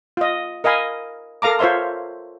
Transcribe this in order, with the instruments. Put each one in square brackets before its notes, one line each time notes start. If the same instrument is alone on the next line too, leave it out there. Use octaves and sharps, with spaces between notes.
[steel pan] F4 D#5
A#4 D#5 F5 G#5 B5
A4 A#4 F5 A#5 D6
F4 C5 C#5 E5 C6